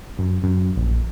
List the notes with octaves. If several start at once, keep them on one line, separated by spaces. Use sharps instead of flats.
F#2
F#2
A#1